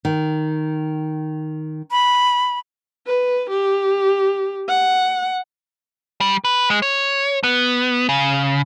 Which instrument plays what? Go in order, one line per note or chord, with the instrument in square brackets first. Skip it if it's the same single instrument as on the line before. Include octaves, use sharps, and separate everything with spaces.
[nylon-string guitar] D#3
[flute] B5
[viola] B4
G4
F#5
[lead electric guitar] G3
B4
G#3
C#5
B3
C#3